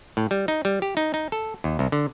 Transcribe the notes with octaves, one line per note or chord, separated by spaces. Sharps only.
A2
G3
D#4
G3
G4
D#4
D#4
A4
D#2
C2
D3